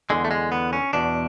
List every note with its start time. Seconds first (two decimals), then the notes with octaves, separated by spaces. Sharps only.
0.10 E2 D3 G#3
0.25 A3
0.31 G#3
0.52 B3
0.73 C#4
0.93 E2 B2 D4